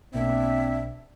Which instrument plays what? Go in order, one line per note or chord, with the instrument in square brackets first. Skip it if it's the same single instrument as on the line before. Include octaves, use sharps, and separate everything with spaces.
[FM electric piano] B1 B2 A#3 [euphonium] C4 [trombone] D4 [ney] E5